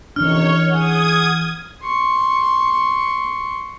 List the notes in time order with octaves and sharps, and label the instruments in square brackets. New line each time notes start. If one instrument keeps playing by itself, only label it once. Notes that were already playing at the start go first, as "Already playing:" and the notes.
[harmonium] F2 C3 D#3 [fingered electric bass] E3 C#4 D4 [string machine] C#5 [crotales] F6
[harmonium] G#4 F#5 [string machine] D#6 G#6
[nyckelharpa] C6 C#6